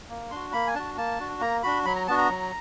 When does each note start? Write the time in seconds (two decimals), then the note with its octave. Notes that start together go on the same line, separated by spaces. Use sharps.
0.09 A#3
0.31 D4 F#4 C6
0.53 A#3 B5
0.67 G#5
0.75 D4 F#4 A5
0.97 A#3 A5
1.19 D4 F#4
1.40 A#3 A#5
1.63 D4 F#4 B5
1.85 F#3 B5
1.96 A#5
2.07 B3 D4 F#4 A5
2.18 A#5
2.30 F#3